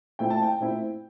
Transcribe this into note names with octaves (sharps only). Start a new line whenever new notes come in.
A#2 A3 C4 E4 G5
A5
G5
A#2 A3 C4 E4